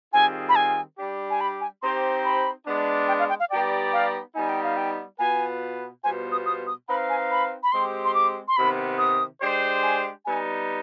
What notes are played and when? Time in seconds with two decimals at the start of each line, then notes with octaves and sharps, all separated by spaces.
0.13 D#3 G3 C4 F4 G#4 G#5
0.49 B5
0.56 G#5
0.98 G3 D4 G4
1.30 G#5
1.41 B5
1.61 G#5
1.82 C4 D#4 G4 C5 C6
2.25 B5
2.66 G#3 B3 D4
3.08 G5
3.19 F5
3.29 G5
3.40 F5
3.50 G3 B3 D#4 G4 D5 G5
3.93 F5
4.35 G3 B3 D#4 G#5
4.49 G5
4.63 F5
4.77 G5
5.19 B2 B3 F4 B4 G#5
6.04 B2 G3 B3 F4 C5 G#5
6.32 D#6
6.46 D#6
6.67 D#6
6.87 C4 D#4 B4 F5 B5
7.09 G#5
7.31 B5
7.63 B5
7.72 G#3 C4 G4 C6
8.05 C6
8.14 D6
8.48 C6
8.56 C3 D#3 B3 B5
8.98 D#6
9.41 G#3 D4 G4 C5
9.83 G#5
10.25 G3 B3 D#4 G#5